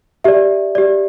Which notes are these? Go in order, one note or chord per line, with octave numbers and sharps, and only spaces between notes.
G4 D5 E5
G4 D5